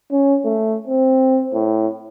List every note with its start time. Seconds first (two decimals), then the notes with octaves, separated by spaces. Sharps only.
0.12 C#4
0.45 A3
0.87 C4
1.54 A2